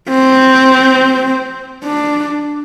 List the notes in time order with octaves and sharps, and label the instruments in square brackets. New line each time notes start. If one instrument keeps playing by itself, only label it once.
[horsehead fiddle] C4
D4